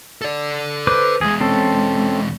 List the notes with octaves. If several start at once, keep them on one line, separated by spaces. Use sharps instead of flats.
A4 D5
B4 C5 D6
E2 G#3 G#4
C4 C#4 A4